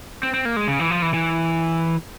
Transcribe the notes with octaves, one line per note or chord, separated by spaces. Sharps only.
C4
C4
A#3
G#3
C#3
E3
F3
E3
E3